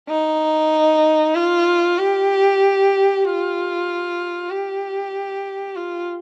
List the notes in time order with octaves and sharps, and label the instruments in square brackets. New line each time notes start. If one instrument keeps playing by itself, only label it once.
[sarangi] D#4
F4
G4
F4
G4
F4